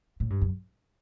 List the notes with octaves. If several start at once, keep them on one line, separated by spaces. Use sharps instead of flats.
A2
G2
F#2